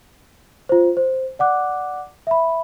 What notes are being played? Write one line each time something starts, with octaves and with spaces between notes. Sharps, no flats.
F4 C5
C5
D5 F#5 D6 F#6
E5 B5